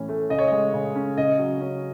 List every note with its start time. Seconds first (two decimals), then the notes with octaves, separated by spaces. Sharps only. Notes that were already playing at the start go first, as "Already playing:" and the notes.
Already playing: A2 E3 C#4
0.09 A3
0.30 C#3 D#5
0.39 C#5
0.48 G#3 D#5
0.74 C#3
0.96 C#4
1.17 C#3 D#5
1.39 F#3
1.61 C#4